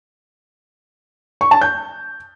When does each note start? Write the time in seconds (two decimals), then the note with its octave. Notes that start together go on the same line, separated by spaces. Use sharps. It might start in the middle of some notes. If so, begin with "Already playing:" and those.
1.41 C#6
1.51 A5
1.61 G6